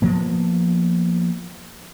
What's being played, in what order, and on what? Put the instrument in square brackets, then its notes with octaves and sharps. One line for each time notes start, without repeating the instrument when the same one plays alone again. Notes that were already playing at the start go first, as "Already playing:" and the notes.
[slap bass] F3 A#3 B3